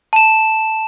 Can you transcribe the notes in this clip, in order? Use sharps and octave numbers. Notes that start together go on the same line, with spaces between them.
A5 E7